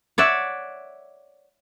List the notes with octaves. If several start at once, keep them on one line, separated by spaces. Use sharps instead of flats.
C#5 D5 E5 F#5